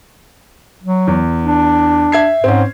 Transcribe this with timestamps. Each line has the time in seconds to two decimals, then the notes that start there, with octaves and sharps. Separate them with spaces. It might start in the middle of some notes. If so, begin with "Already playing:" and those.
0.83 F#3
1.07 E2
1.43 D4
2.12 E5 G#6 C7
2.44 G#2 C4 C#4